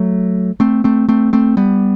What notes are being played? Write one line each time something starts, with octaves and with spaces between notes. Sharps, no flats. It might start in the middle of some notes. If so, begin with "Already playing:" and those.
Already playing: F#3 A3
A3 C4
A3 C4
A3 C4
A3 C4
G3 B3